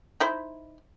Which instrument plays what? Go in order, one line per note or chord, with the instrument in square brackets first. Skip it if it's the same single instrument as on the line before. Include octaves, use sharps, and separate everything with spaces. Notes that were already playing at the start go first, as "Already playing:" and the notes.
[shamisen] D#4 E4 C5